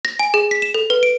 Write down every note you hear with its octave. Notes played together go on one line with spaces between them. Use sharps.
A#6
G#5
G#4
B6
E7
A4
B4
D7